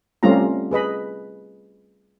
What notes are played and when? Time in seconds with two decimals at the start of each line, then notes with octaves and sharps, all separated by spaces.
0.23 G3 A3 C4 C#4 F4 A#5
0.71 G#4 B4 D#5 B5